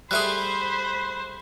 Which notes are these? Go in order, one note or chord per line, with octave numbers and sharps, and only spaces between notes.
G3 A3 G#4 C5 B5 F#6